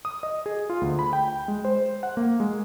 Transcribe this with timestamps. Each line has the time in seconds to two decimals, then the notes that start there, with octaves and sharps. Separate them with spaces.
0.05 D#6
0.23 D#5
0.46 G#4
0.70 F4
0.81 D2
0.99 B5
1.13 G5
1.48 G#3
1.65 C5
2.03 F#5
2.17 A#3
2.40 G#3